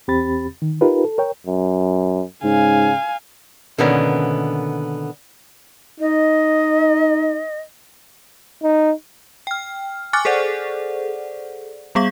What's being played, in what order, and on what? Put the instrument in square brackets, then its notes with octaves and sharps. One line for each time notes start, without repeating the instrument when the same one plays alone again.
[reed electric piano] E2 C4 G4 B5 A6
D#3
D#4 F4 G4 A#4 B4
A4
A#4 C#5 G5
[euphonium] F#2
[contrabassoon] G#2 [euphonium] C#3 [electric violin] F5 G#5
[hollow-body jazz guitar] B2 D3 D#3 A#3 B3 C#4
[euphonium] D#4 [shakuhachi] D#5
[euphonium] D#4
[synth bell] G5 F6
G#5 C#6 D6 F6 F#6 A6
G#4 A4 C5 D5 F#5
G3 B3 G#4 F5 C#6